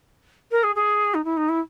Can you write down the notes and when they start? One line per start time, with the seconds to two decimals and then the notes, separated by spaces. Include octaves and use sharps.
0.51 A#4
0.63 G#4
0.75 G#4
1.14 D#4
1.24 E4
1.37 D#4
1.49 E4